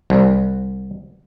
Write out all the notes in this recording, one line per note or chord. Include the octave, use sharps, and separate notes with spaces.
C2